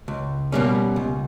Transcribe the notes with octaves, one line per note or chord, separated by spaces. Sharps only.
C#2
B2 G3 A#3 C#4
C#2